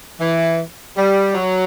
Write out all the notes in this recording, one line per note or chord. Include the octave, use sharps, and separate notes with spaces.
E3
G3
F#3